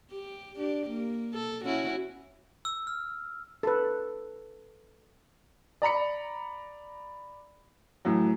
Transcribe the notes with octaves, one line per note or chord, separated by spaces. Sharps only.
G4
D4 G4
A#3
A4
C#4 E4 F#4
E6
F6
A4 B4
D5 A#5 B5 C#7
A2 E3 F#3